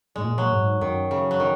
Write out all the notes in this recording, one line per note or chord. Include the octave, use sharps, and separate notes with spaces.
G#2 G#3
A#2
F#3
G#2
F#2 D#3
C#3
F#3
D#3